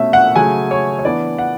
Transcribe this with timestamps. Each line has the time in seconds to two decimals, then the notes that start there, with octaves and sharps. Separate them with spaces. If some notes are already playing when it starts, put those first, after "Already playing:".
Already playing: B2 A3 C#4 E5
0.13 F#5
0.36 C#3 F#3 A3 G#5
0.71 C#5
0.99 C#5
1.04 E3 B3 D4 D5
1.38 F#5